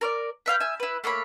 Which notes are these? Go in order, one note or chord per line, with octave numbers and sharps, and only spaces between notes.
A#4 C#5 D5
B4 E5 F5 G5
E5 G#5
E4 B4
A3 A#3 C#5 B5